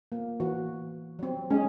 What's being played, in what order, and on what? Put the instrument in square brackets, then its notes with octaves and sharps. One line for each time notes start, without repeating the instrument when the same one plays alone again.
[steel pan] A#3
E3 F#4
F#3 C4
[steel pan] G#3 G#4 [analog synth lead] C#4